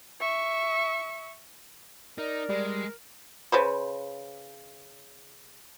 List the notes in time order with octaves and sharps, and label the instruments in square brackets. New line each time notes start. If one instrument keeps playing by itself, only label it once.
[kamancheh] E5 C#6
[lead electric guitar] D#4 [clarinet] A#4 [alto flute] D5
[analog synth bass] G3 [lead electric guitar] G#3
[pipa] C#3 B4 C5